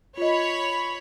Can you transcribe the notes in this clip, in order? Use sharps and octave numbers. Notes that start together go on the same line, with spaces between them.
F4 C#5 D#5 B5